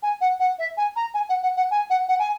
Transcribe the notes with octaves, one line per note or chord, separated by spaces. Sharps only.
G#5
F#5
F#5
E5
G#5
A#5
G#5
F#5
F#5
F#5
G#5
F#5
F#5
G#5